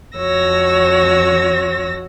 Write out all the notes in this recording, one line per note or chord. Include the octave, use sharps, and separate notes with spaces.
F2 F#4 C#5 E6 A#6